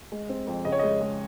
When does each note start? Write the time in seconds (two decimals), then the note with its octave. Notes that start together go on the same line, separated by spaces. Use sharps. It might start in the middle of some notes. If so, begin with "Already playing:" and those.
0.12 G#3
0.29 C4
0.47 F2
0.65 C#3 D#5
0.72 C#5
0.79 G#3 D#5
1.01 G#3